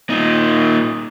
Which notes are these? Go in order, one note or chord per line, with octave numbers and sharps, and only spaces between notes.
A#2 D#4